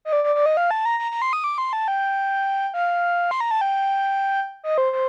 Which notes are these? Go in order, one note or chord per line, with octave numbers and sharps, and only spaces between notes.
D#5
D5
D5
D5
D#5
F5
A5
A#5
A#5
A#5
C6
D#6
D6
C6
A5
G5
F5
C6
A#5
A5
G5
D#5
C5
C5